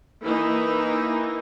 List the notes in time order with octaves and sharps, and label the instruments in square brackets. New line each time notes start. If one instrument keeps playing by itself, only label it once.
[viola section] E3 A#3 D#4